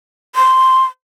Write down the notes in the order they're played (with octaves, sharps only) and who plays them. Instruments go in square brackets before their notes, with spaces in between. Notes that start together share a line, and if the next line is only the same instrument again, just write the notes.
[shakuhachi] C6